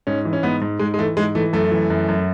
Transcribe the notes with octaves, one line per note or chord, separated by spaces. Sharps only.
G#2 C#4
E3
C#4
G#2 B3
G#2
G#2 G#3
G#3
E3 A3
G#2 G#3
E3 A3
F#2 A3
E3
F#2
F#2